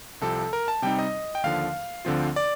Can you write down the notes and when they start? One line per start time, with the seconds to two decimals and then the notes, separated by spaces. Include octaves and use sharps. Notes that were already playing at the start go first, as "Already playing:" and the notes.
0.21 C2 C3 F3 C4 A4
0.53 A#4
0.68 A5
0.82 C3 G3 C4 D#4 G5
0.98 D#5
1.35 G5
1.44 D#2 D3 F3 F5
2.05 D2 D3 F3 C4 F4
2.36 D5